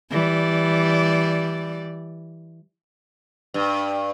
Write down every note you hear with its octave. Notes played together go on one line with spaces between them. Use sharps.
E3 G3 D5
G2